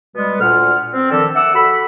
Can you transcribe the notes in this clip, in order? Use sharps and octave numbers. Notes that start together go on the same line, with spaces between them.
B2 G3 G#3 B3
D2 A#2 F#5 F6
C4
D3 D#3 F3 G4 A4
E5 F#5 D6 E6
F#4 A4 B5